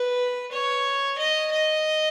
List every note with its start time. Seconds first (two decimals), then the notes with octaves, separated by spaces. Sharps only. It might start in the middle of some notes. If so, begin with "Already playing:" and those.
Already playing: B4
0.52 C#5
1.18 D#5
1.52 D#5